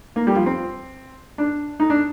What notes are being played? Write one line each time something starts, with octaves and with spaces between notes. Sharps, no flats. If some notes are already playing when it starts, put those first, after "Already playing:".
A#3
G3
F3
C4
D4
D#4
D4